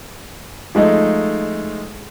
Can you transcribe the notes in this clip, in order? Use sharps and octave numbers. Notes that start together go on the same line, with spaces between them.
F3 G#3 A3 D#4